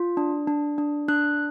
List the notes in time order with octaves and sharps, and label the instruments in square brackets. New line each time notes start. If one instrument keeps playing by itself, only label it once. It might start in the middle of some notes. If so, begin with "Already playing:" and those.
Already playing: [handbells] F4
D4
D4
D4
D4 F#6